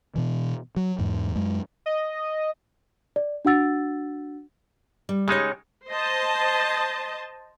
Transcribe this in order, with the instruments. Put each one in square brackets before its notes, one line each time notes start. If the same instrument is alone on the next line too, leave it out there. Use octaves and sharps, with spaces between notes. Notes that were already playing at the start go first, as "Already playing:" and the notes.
[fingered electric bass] B2 E3
F#3
E2 G#2
F#2 G#3
[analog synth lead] D#5
[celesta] D5
D4 F#4 F#5 E6 A6
[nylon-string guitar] G3
[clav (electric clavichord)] C#3 G#3 D#4 [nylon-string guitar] G4 C#5
[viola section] C5 D#5 A5